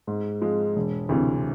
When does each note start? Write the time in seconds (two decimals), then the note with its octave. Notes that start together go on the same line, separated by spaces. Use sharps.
0.07 G#2
0.41 F3 G#3
0.76 E1
1.09 D2 C3 E3